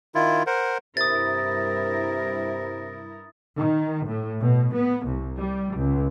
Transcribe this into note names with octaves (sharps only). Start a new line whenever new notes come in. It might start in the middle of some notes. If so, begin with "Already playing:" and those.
D#3 E4 F4
A#4 C5 F#5
G2 C3 E4 A#4 D#6 A6
D#3
A2
B2
B3
C2
G3
C#2